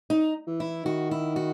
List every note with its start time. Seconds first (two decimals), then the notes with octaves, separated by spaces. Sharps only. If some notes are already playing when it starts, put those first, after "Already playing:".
0.10 D#4
0.47 E3
0.60 E4
0.85 D#3 F#4
1.11 E4
1.36 F#4